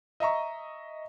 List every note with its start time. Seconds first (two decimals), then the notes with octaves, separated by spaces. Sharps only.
0.20 D#5 E5 A#5 C#6